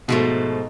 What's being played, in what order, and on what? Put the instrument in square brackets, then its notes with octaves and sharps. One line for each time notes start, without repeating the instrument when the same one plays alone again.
[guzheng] G#2 F3 A3 [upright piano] B2